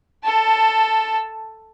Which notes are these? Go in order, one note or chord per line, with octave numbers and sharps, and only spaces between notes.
A4 A5